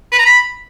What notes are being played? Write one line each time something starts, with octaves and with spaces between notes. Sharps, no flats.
B4
A#5
B5